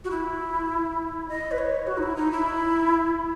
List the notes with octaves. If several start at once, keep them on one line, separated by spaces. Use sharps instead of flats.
F#4
E4
D#5
B4
C#5
F#4
D#4
E4
D#4
E4